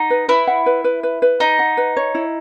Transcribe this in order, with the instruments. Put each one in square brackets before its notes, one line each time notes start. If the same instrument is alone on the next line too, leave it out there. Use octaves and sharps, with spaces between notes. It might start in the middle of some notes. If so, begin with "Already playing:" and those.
Already playing: [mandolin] D#4 [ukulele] F#5
[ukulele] B4
[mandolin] E4 [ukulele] B4
[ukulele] F#5
B4
B4
B4
B4
[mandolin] D#4 [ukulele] D#5
[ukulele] F#5
B4
C#5
E4